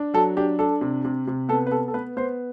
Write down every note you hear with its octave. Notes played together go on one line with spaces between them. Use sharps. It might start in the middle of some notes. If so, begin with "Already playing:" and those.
Already playing: D4
F#3 A4
D4 G4
D4 A4
C3
C3
C3
B3 A4
B4
B3 A4
A4
B3 B4
B3 C5